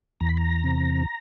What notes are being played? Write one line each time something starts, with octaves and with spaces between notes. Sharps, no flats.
E2 A#5
B5
A#5
C3